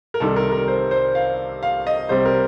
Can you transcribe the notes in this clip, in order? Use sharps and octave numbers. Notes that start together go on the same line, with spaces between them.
A#4
C2 C3 D#3 G3 A4
A#4
A#4
C5
C5
F5
F5
D#5
C2 C3 G3 C4 C5
A#4